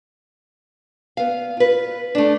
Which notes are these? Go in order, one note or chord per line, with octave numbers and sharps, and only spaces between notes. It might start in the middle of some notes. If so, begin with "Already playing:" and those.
B3 F5
F4 B4
A3 D4